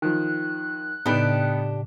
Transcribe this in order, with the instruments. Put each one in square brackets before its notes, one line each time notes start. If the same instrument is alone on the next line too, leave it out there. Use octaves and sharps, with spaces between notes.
[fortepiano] D#3 F3 [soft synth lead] F#6
[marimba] A2 C#3 [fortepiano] B3 D#4 A5 [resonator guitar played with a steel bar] D4 G4